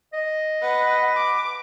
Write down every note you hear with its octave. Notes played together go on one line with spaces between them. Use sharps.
D#5
B4 F#5
D6